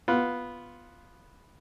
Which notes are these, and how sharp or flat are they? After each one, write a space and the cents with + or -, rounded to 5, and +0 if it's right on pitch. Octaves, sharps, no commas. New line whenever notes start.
B3 +0 F4 +0